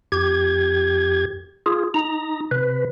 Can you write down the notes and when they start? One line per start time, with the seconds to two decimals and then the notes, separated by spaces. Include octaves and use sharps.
0.12 F2 G4 G#6
1.66 F4 G#4
1.94 D#4 A#5
2.51 C3 B4